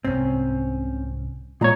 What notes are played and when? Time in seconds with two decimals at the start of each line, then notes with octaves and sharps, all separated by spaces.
0.05 C2 G#2 C3 C4 C#4
1.61 A#2 G#3 C#5 A#5